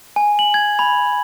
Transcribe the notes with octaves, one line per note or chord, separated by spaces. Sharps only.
G#5
F#7
G#6
B5